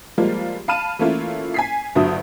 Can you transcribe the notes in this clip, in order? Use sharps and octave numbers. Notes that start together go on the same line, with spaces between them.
F3 G3 G#3 A#3 F4
F5 A5 B5 F6 D#7 E7
E3 A3 A#3 C#4 E4 F4
G#5 B6 C7
G1 D2 G2 F#3 E5 D#6